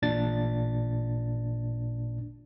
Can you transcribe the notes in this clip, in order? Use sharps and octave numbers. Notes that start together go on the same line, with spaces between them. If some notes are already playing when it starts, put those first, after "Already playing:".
A1 A#2 D4 A6